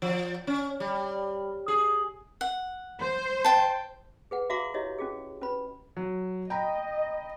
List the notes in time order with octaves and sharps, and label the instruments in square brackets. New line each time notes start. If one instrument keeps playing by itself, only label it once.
[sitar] F3
C#4
G3
G#4
[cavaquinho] F#5
[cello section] C5
[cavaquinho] G5 A5
[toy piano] G#4 B4 F#5
F#4 E5 F5 A#5 C6 D6
E4 G4 C#5 D#5 E5
C#4 F#4 G#4
C#4 B4 B5
[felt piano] F#3
[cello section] D#5 [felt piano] G5 A#5 B5